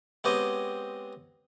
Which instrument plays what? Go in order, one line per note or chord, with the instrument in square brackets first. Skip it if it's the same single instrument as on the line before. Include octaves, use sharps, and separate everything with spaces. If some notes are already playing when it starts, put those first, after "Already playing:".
[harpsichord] G#3 B3 C4 G4 C#5 D#5